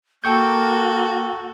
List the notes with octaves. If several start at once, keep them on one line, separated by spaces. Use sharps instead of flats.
A#3 F#4 A4 G5 C#6 G6